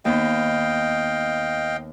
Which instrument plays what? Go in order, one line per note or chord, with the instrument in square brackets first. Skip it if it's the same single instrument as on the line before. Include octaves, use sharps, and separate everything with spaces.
[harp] D#2 B3 [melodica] D#5 F5 G5